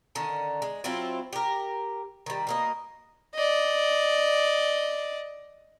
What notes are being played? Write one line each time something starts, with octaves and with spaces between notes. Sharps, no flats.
D3 D#3 C#4
G#3
F#3 C4 E4 F4
G4 A#4
D#3 G3
B2 A#3 D#5
D5 D#5